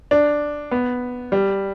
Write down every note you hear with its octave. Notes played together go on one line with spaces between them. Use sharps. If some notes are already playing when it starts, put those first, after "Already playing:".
D4
B3
G3